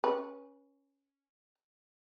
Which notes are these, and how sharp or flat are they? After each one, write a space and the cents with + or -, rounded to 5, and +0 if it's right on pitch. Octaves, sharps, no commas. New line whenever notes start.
C#4 +0 B4 -30